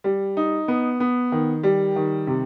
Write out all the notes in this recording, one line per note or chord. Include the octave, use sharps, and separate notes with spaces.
G3
D#4
B3
B3
D#3
G3
D#3
C3